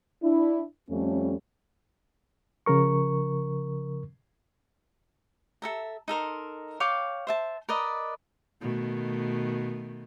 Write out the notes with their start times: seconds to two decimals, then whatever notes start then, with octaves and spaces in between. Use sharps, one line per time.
0.22 D4 E4
0.89 F2 G3 A3 C#4
2.66 C#3 F3 A#4 C#6
5.62 A4 E5 A#5
6.08 D#4 A4 A#4 C6
6.80 C#5 F5 G5 D6
7.27 C5 E5 A5
7.69 A#4 B4 D5 D#5
8.61 B2 D#3 A3